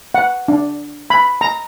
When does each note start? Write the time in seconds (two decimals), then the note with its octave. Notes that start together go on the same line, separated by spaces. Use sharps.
0.15 F#5
0.48 D4
1.10 B5
1.41 A#5